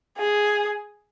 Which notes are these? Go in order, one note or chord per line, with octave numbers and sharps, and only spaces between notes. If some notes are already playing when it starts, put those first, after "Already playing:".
G#4